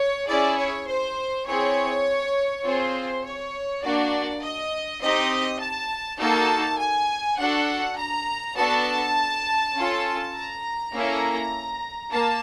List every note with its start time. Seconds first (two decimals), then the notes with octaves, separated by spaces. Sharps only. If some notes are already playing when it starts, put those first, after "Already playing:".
Already playing: C#5
0.27 C#4 E4 G#4 D5
0.57 C#5
0.87 C5
1.46 C4 E4 G#4 C#5
2.64 C4 F4 G#4 C5
3.24 C#5
3.83 A#3 D4 F#4 D5
4.43 D#5
5.01 C4 D#4 G4 D#5
5.60 A5
6.19 A#3 D#4 F#4 A4 A5
6.78 G#5
7.38 D4 F#4 A4 F#5
7.98 A#5
8.56 B3 D4 F#4 A4 A5
9.75 C#4 F4 A4
10.34 A#5
10.93 A#3 C#4 E4 A4
12.11 A#3 A5